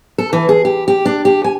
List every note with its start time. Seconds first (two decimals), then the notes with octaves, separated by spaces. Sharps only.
0.18 A4
0.33 E3
0.49 G#4
0.65 G4
0.88 G4
1.05 D4
1.25 G4
1.44 G#5